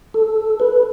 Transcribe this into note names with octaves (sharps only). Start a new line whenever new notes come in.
A4
B4